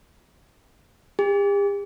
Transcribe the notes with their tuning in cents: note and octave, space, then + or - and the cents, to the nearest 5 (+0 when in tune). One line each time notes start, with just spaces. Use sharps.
G4 +45